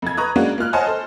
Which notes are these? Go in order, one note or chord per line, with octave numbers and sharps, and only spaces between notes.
F2 G#6
B4 A#5 C#6 D#6 F#6
G#3 A#3 C#4 D4 F#4
A#3 F4 F6 F#6
C5 C#5 D#5 F#5 G#5 A5
A4 C5